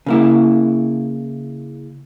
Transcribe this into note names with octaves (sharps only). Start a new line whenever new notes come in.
C#3 A#3 E4